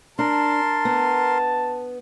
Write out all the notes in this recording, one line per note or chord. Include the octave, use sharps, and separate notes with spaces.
D4 A#4 A5 C6
B3